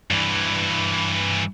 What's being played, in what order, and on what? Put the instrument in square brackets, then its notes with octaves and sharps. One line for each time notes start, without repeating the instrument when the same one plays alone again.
[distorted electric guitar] G2 E3